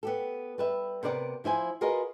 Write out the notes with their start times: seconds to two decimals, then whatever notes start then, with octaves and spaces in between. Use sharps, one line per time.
0.03 B3 G4 A4
0.58 G3 B4 E5
1.03 C3 B3 A#4 D5 D#5 F#5
1.44 F3 E4 C5 G#5
1.81 F4 F#4 G#4 A#4 B4 D#5